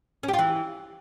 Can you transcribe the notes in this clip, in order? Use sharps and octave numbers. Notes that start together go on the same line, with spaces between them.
C#4
G4
F4
E3